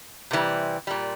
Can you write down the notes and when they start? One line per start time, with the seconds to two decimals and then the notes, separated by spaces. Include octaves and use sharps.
0.31 C3 E3 G3
0.87 A#2 G3